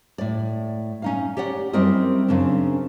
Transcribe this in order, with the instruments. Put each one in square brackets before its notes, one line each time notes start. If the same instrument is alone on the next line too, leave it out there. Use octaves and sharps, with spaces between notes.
[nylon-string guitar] A2 D5
C#4 D#4 F5
G4 C#5 D5 F#5
F#2 G3 C4 E4 A#4 D#5
F#2 C#3 C4 D4